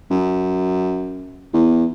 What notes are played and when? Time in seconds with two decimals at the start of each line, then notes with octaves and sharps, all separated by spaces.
0.10 F#2
1.53 E2